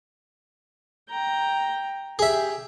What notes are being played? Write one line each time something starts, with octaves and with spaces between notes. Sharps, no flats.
G5 A#5
G4 G#4 E5